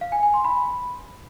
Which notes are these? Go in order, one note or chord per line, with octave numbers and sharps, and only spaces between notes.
F5
G#5
G#5
C6
B5